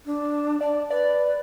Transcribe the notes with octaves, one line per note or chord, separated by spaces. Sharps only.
D4
D5 A5
B4 D5